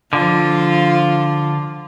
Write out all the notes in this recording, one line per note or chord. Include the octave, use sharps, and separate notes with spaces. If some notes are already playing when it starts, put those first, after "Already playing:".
D3 F3 F4